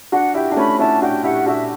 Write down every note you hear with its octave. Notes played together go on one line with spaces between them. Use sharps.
D4 F#4 F#5
E4 G4 G5
D4
A3 C#4 B5
C#4 E4 A5
D4 F#4 G5
E4 G4 F#5
D4 F#4 E5